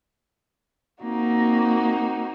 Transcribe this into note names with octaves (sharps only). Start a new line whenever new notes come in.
A#3 C4 D#4 F#4